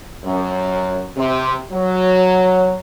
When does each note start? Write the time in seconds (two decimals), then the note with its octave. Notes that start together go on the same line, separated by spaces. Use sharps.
0.24 F#2
1.16 C3
1.72 F#3